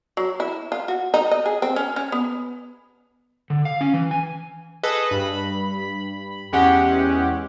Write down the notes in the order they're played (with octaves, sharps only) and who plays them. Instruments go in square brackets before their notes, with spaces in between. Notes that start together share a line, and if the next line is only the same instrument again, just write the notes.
[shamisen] F#3
E4
F4
F#4
D#4
D#5
G#4
C4
C#4
C#4
B3
[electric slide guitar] D3
F5
C#4
E3
G#5
[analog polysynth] G#4 A4 B4 D#5
G2 B5
E2 G#3 C#4 G4 F#5